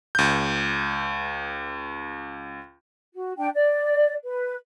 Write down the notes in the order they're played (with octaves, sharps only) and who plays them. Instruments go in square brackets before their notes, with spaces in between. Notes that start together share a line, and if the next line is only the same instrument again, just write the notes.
[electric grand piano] C#2 G6
[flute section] F#4
D4 G5
D5
B4